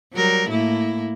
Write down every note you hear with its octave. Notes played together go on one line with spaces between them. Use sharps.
F#3 G3 A#4
A2 A#3 E4